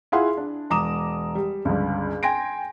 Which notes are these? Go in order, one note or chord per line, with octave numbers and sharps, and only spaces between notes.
E4 F4 G#4 F5 F#5 C6
D4
E1 A#5 D6 D#6 E7
G3
G1 C#2
G5 G#5 C6 A#6 D7